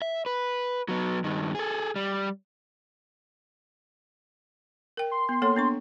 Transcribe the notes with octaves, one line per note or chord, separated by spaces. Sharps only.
E5
B4
F#3 B3
G2 D#3
G#4 A4
G3
A#4 G5
C6
B3
A#3 A4 C#5
B3 D4 C#6